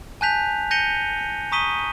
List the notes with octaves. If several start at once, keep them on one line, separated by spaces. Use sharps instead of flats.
G#5 A5 F#6 G6 B6 F7
G6 A#6 C#7 D#7 F7 G7
A#5 C#6 D#6 B6 D#7 G7